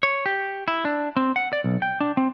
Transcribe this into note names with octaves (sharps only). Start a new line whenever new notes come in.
C#5
G4
E4
D4
C4
F#5
D5
B1
G5
D4
C4